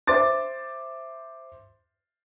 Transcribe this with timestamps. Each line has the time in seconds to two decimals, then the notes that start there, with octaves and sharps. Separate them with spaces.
0.07 C5 E5 C6 D6 A6